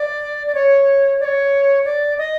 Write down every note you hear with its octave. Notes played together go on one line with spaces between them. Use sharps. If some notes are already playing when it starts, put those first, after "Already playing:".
Already playing: D5
D5
C#5
D5
C#5
D5
D#5